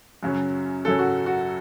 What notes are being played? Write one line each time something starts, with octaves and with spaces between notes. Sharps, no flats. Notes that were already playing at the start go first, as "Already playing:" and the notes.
F#2 C#3 F#3 C#4
F#2 C#3 F#3 C#4 A4
F#4
F#4